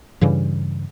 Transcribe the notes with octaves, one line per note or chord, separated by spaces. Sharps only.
G2 C#3 E3 G3